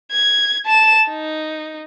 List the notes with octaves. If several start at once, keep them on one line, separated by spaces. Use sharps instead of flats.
G#6
A5 E7
D#4